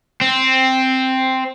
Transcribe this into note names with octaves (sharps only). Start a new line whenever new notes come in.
C4